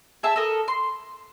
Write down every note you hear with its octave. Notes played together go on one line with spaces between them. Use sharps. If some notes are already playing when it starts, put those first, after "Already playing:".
G#4 E5 A5
A4 A#4 D#6
C6